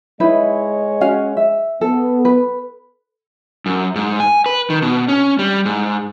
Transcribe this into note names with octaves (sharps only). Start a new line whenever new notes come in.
G#3 D#4 E4 B4 C#5 D#5
C#4 F#4 F5
E5
B3 A4
B4
F#2
G#2
G#5
B4
D#3
B2
C#4
G3
G#2